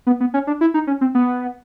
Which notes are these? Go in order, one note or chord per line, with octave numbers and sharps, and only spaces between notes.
B3
B3
C#4
D4
E4
D#4
C#4
C4
B3